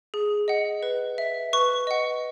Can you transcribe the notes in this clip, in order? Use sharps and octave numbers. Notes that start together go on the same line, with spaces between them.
G#4
D#5 F#5
B4
E5
B4 C#6
D#5 F#5